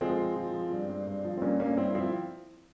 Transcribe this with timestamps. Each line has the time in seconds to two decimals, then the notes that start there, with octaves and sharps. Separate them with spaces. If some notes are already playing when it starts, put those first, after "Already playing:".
0.01 F3 G#3 C4
0.19 F3
0.36 F3
0.54 F3
0.72 G2
0.89 G2
1.07 G2
1.25 F3
1.37 C4
1.42 G2 A#3 C#4
1.60 G2 A#3 C#4
1.77 G2 C4 E4
1.95 F3 C4 E4